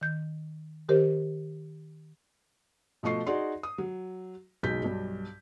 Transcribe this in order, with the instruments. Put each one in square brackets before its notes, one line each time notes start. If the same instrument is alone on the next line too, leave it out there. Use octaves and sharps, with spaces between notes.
[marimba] D#3 G6
D#3 G4 A#4 C5
[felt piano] B2 F3 A3 D#5 C#6 C7
D#4 F#4 G#4 D5 C6
D#6
F#3
F#1 B1 G#3 D#4 G6 B6
B1 G2